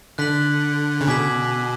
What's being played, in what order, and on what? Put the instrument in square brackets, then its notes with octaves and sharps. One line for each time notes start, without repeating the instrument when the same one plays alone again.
[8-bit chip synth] D3 [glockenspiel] F#6 B6 F#7
[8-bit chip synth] C#3
[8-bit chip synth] B2 [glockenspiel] G#5 D6 G#6 B6 F#7